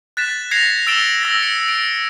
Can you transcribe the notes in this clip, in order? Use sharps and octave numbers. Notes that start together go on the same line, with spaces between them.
F#6 A6 B6 E7
G#6 A#6 C7 C#7 F7
E6 A6 D7 E7 G7
E6 A#6
C#7
D7